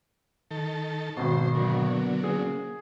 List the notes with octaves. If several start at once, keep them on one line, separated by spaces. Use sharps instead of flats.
D#3 A4
G#1 B2 C5
D3 F#3 A#3 B3
A#3 C#4 G#4 C5